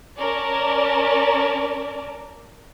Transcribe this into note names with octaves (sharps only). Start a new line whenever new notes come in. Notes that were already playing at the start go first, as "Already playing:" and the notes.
C#4 A#4 D5 A5